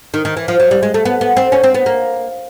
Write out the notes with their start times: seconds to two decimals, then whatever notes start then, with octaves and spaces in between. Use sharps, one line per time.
0.14 D#3
0.25 D#3
0.37 E3
0.48 F3
0.60 F#3
0.71 G3
0.83 G#3
0.94 A3
1.05 B3
1.21 B3
1.37 C4
1.52 C#4
1.63 C4
1.74 B3
1.86 A#3